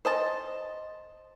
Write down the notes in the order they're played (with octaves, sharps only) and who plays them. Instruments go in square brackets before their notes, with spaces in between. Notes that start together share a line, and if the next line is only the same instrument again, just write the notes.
[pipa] C5 D#5 A5